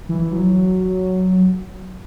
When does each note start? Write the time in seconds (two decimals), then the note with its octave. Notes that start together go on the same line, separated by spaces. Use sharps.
0.09 E3
0.32 F#3